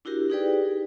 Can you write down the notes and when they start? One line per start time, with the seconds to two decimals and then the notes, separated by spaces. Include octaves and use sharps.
0.05 D4 E4 F#4 G4 A#4
0.30 D#4 G4 G#4 B4 D5 G5